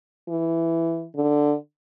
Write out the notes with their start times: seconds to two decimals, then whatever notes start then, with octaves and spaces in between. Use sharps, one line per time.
0.28 E3
1.16 D3